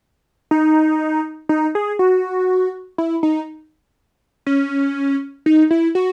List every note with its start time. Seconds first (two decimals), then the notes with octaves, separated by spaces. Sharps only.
0.51 D#4
1.49 D#4
1.75 G#4
1.99 F#4
2.98 E4
3.23 D#4
4.46 C#4
5.46 D#4
5.71 E4
5.95 F#4